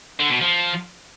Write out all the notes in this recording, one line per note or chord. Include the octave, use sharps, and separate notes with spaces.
D3
B2
F3